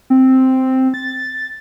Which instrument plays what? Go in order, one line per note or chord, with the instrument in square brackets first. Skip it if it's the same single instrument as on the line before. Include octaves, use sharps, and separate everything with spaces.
[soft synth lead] C4
A6